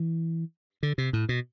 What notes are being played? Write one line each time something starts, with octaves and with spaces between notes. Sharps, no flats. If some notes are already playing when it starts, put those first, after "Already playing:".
Already playing: E3
D3
C3
A2
B2